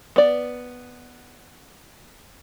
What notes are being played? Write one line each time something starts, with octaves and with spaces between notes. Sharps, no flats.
B3 D5